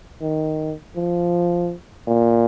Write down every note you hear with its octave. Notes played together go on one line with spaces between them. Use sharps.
D#3
F3
A#2